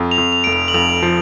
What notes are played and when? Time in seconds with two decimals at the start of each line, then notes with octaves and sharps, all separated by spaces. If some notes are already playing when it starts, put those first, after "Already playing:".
Already playing: F2
0.11 F7
0.18 F2
0.33 F7
0.44 F1 D7
0.53 F7
0.68 F#7
0.74 F2 F7
1.02 F3